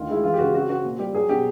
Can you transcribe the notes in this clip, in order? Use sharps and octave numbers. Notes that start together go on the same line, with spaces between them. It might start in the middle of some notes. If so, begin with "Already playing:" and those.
Already playing: D2 D#3 F4
G#3 E4
E3 F4
G4
C#3 F#4
C4 F#4
C4 F#4
A#2
G3 G4
F#3 G#4
B2 G4